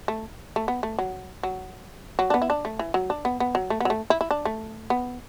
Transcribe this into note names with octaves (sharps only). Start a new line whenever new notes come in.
A3
A3
B3
A3
F#3
F#3
F#3
D4
B3
E4
D4
A3
E3
F#3
D4
B3
B3
F#3
A3
B3
F#3
A3
E4
E4
D4
A3
B3